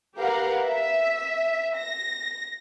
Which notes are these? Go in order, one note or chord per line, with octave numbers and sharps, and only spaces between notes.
G4 A#4 B4 F5 F#5
E5
A#6